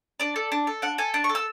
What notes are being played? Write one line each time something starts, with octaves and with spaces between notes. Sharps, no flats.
D4 D5
A4
D4
A4
D4 F#5
A4 G#5
D4 A5
C#6
A4
E6